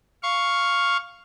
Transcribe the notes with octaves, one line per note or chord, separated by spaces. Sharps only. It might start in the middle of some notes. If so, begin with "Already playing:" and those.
F5 C#6